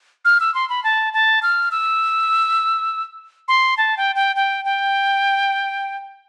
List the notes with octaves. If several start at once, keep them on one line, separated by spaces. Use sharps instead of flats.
F6
E6
C6
B5
A5
A5
F6
E6
C6
A5
G5
G5
G5
G5